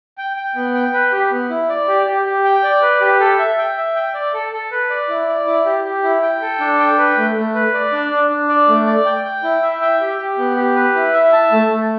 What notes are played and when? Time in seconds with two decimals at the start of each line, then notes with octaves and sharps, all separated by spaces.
0.18 G5
0.36 G5
0.56 B3
0.74 G5
0.93 B4
1.12 G4
1.31 B3
1.50 E4
1.69 D5
1.88 G4
2.07 G4
2.25 G4
2.44 G5
2.63 D5
2.82 B4
3.01 G4
3.20 A4
3.39 E5
3.58 G5
3.77 E5
3.96 G5
4.14 D5
4.34 A4
4.53 A4
4.71 B4
4.90 D5
5.09 E4
5.28 D5
5.47 E4
5.66 G4
5.85 G4
6.03 E4
6.22 G5
6.42 A4
6.60 D4
6.79 G5
6.98 B4
7.17 A3
7.36 A3
7.55 B4
7.74 D5
7.92 D4
8.12 D4
8.30 D4
8.49 D5
8.68 A3
8.87 D5
9.06 G5
9.24 G5
9.43 E4
9.63 E5
9.81 G5
10.00 G4
10.19 G4
10.38 B3
10.57 G4
10.76 B4
10.95 E4
11.14 E5
11.32 A5
11.52 A3
11.70 A3